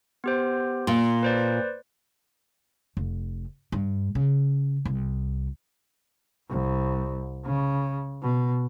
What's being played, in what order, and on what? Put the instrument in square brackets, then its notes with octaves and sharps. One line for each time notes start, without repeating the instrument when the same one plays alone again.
[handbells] B3 G4 C5
[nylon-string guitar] A#2 [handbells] C6
[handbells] B4 C5 D5
[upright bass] F1
G2
C#3
C2
[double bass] C2
C#3
B2